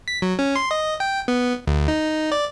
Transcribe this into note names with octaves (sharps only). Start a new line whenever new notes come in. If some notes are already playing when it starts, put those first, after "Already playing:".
B6
F#3
C#4
C6
D#5
G5
B3
D2
D#4
D5